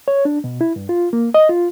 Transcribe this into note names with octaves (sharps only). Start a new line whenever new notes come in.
C#5
D4
B2
E4
G2
F4
A#3
D#5
F4